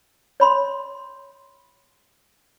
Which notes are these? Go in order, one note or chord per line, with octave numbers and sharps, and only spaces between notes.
C#5 B5 C6